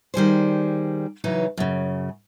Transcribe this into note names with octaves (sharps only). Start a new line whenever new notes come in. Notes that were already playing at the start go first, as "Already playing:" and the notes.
D#3 G3 G#4 C5
C#3 E3 F#3 D#4
F#2 C#3